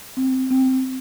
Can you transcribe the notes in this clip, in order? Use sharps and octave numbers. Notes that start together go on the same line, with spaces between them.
C4
C4